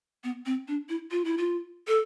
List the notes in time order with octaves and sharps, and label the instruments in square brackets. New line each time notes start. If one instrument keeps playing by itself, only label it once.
[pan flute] B3
C4
D4
E4
F4
E4
F4
A4